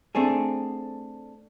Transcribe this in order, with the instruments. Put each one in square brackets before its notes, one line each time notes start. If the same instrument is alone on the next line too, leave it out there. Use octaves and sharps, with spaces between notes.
[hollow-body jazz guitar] A3 C4 D4 G#4